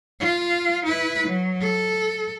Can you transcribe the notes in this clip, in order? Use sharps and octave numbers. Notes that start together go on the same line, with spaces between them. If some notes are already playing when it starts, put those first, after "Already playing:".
F4
E4 B4
F#3
A4